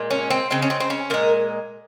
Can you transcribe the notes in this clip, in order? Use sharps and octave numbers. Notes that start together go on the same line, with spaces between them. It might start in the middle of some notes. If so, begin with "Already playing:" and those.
Already playing: A#2 G#3
C#4
C4
C#3 G#3 C4
C#4
C4
C4
C#4
A#2 G#3 A#4